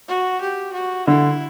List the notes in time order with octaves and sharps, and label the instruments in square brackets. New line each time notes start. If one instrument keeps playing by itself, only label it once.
[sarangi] F#4
G4
F#4
[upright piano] D3 [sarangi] E4